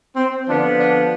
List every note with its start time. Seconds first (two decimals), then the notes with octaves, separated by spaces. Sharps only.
0.16 C4
0.47 D3 F3 B3 D4
0.78 D4